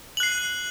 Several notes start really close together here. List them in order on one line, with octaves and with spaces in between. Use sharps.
F#7 F#6 C7